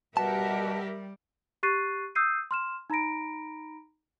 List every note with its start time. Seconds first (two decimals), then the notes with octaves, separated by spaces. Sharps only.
0.17 B2 G3 G4 A#4 E5 F#5 A5
1.63 G4 C#6 F#6 A6 C7 D#7
2.15 D#6 E6 G6 C7 D#7
2.51 C6 F6 E7
2.90 D#4 A#5 B5 A#6 D7